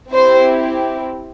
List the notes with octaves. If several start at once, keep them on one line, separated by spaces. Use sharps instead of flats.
C4 E4 G4 C5